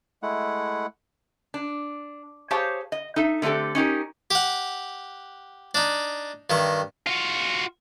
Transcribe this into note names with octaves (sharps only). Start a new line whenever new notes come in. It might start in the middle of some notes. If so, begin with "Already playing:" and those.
G#3 A3 E4 F#5
D4
G4 G#4 C5 C#5 F5 A5
D#5
D#4 A4 E5
D3 A3 C4 G4 A4
C#4 D#4 G4 A#4
G4 F#5
D4 D#4
G2 D#3 C#6
F4 F#4